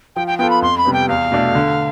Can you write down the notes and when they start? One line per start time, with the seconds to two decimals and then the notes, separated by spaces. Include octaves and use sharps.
0.16 F3 G5
0.27 G5
0.38 B3 F4 A4 G5
0.50 B5
0.62 F2 C6
0.78 B5
0.85 C3 G3 B3
0.93 G5
1.09 E2 F5
1.32 B2 A3 D4 A4
1.55 D3